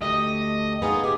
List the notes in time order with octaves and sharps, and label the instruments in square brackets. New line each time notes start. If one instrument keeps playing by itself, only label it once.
[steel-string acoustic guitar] D2 A3 G4 [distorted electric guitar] D#5
[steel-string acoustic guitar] B3 D#4 F4 [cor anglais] G#4
[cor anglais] G4 [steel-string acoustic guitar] G#4